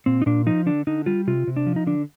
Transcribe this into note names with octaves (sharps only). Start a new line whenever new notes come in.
A#2 C4
D#4
A#2 D4
F3 D#4
D3 D4
D3 D#4
G3 F4
C3 F4
C3
D4
F3
D#4
D3 D4